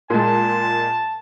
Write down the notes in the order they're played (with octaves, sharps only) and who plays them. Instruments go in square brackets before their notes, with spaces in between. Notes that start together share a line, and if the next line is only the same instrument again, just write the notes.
[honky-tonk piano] A#2 G#3 [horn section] A5